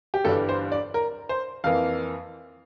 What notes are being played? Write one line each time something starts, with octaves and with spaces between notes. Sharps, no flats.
G4
G1 G2 E3 G3 D4 A4
C5
D5
A#4
C5
F2 E3 A#3 F5